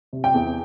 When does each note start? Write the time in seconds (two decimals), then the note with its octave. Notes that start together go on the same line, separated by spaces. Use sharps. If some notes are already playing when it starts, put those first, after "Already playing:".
0.13 C3
0.24 G5
0.34 E2